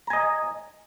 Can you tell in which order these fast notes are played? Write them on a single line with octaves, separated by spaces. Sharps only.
A#5 G#5 D#5